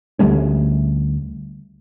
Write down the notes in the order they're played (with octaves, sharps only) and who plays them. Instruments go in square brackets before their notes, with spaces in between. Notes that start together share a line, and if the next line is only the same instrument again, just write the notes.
[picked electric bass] D2 G3 A3 C#4